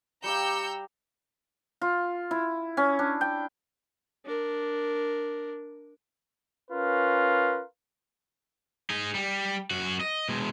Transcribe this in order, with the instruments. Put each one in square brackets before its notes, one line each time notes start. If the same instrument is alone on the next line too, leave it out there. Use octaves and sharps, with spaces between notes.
[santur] G3 G4 F5 [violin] A#5 [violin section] E6 G6 C#7
[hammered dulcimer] F4
E4
C#4
D4
G5
[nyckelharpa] D4 A#4
[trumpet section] C#4 F4 A#4 B4
[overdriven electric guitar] D#4 G#4
G3
F#2 F#4
D#5
B2 G#3